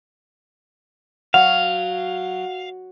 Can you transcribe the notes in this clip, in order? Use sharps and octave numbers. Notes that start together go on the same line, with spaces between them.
F#3 F5 F#5